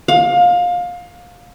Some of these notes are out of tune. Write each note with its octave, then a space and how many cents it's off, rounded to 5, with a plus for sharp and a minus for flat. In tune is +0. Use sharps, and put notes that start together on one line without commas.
F5 +25